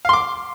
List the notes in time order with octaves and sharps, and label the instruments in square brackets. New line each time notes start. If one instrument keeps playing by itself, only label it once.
[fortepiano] F5
C6
D6